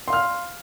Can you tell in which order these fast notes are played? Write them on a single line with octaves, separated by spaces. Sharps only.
C6 F5 F6